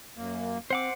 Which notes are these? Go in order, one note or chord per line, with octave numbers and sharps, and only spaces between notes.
F#2 A#3
C4 C5 F#5 D6